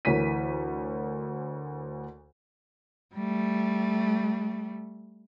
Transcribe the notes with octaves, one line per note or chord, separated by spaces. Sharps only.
D2 E3 A#4 C#5 B6 D#7
G3 A3